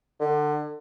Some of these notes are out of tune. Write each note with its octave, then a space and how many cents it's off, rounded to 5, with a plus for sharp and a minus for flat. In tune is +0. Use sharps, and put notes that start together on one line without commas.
D3 +30